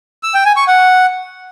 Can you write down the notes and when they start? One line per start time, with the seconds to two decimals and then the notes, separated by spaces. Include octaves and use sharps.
0.23 E6
0.34 G5
0.45 G#5
0.56 C#6
0.67 F#5